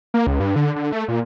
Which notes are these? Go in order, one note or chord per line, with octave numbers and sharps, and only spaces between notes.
A#3
C#2
G2
D3
D3
A3
A#2